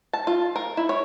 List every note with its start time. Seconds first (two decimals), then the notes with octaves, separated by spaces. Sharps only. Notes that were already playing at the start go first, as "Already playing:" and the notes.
0.13 A5
0.27 F4
0.56 A#4
0.77 E4
0.89 C#5